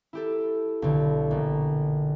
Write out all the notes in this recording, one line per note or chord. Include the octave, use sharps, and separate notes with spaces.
E4 G4 A4
B1 D3
A#1